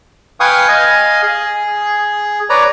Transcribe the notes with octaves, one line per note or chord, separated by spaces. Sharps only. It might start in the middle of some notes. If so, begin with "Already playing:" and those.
B4 F5 G5 G#5 C#6 D#6
D#5 F5 G#5
G#4
B4 C#5 D5 A#5